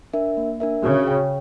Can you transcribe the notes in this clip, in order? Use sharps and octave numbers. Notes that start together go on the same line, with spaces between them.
D4 A#4 E5
A#3
D4 A#4 E5
C#3 F#4
C#5 G5